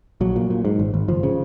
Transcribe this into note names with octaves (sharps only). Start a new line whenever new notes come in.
A#1 F#3
A#2
A#2
G#2
G#1
G#1
F#1 F3
C#3